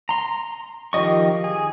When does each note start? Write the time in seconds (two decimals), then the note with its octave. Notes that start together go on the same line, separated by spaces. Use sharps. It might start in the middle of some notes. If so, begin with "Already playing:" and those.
0.09 A#5 C6
0.93 D#3 F3 G4 D#5 C#6
1.44 G#4